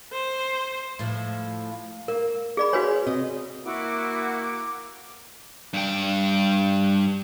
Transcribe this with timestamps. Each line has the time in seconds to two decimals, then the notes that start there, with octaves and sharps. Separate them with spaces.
0.12 C5
0.99 A2 F3
2.08 A#3 A#4
2.57 G#4 D5 B5
2.73 F#4 G#4 B4 C#5
3.07 C3 D#5
3.65 A#3 E4 F#4 D6
5.74 G2 G5